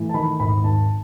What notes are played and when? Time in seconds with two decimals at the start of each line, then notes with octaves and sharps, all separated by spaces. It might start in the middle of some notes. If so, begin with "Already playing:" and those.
Already playing: A2 E3
0.09 A5
0.14 D#3 B5
0.40 G#1 B5
0.64 G#1 A5